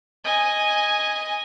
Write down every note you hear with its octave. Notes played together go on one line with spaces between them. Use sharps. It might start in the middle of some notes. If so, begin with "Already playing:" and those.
D#5 G#5